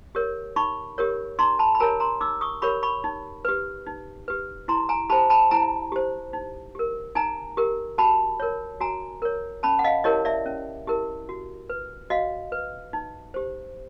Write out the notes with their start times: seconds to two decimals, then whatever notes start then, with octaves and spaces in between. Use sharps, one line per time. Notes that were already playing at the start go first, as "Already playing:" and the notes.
0.15 G4 A#4 C#5
0.56 D#4 B5 C#6
0.98 G4 A#4 C#5
1.39 D#4 A#5 C6
1.59 A5 B5
1.75 B5
1.80 G4 A#4 C#5 G#5 A#5
2.00 A#5 C6
2.21 D#4 D6 E6
2.41 C#6 D#6
2.62 G4 A#4 C#5 B5 C#6
2.83 B5 C#6
3.04 D#4
3.45 G4 B4
3.86 D#4
4.28 G4 B4
4.68 E4 A#5 C6
4.89 G#5 A#5
5.10 G4 C5 A5 B5
5.30 A5 B5
5.51 E4 G#5 A#5
5.92 G4 C5
6.33 D#4
6.75 G4 A#4
7.15 D#4 G#5 A#5
7.57 G4 A#4
7.98 F#4 A5 B5
8.40 A#4 C#5
8.81 F#4 G#5 A#5
9.22 A#4 C#5
9.63 C#4 A5 B5
9.79 F#5
9.84 D#5 F5
10.04 E4 G4 A#4 C#5 D#5
10.25 D5 E5
10.46 C#4
10.87 E4 G4 A#4
11.29 F#4
11.70 B4
12.10 F#4 D#5 F5
12.52 B4
12.93 D#4
13.34 G4 C5